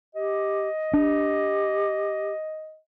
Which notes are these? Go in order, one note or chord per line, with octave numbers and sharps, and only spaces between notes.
G4 D#5
D4 G4